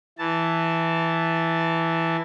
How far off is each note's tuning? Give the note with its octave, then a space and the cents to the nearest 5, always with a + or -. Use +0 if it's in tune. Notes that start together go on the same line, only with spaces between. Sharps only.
E3 +0 A5 +0